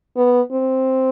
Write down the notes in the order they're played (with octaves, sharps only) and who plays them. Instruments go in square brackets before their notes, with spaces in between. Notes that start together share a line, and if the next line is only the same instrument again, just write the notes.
[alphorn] B3
C4